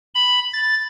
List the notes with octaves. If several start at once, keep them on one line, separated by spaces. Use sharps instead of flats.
B5
A6